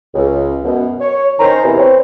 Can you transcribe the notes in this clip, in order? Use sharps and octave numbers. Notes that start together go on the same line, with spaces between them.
C#2
F#2 B2
C#5
D#3 C#4 C5 A#5
E2 C3 E3
C4 B4 C#5